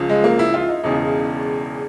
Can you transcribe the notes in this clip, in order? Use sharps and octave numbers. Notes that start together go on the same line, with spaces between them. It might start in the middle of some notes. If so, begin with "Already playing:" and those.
Already playing: C#2 C#3 F3
G#3
A#3
E4
F4
D#4
E1 E2 C#3 E3 D#4